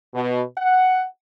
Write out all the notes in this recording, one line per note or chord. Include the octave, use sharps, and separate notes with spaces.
B2
F#5